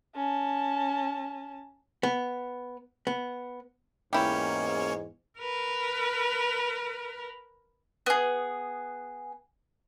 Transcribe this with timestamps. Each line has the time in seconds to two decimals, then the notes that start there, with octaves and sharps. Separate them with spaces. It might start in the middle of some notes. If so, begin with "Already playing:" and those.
0.15 C#4 A5
2.03 B3
3.07 B3
4.13 E2 G#2 A#3 C#4 E4 G4 C#5
5.39 A#4 B4
8.06 B3 G#4